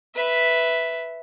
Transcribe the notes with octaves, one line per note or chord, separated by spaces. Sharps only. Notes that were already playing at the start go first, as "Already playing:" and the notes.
B4 E5